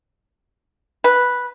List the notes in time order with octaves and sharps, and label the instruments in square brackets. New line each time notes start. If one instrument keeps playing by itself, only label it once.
[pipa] B4